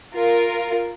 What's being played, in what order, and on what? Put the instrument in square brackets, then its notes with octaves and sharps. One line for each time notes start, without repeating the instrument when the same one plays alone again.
[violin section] F4 A#4